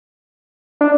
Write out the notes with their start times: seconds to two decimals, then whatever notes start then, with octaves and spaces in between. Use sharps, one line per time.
0.81 D4